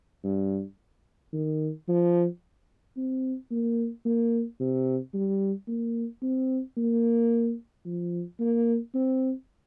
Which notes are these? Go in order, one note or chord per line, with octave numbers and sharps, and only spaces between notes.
G2
D#3
F3
C4
A#3
A#3
C3
G3
A#3
C4
A#3
F3
A#3
C4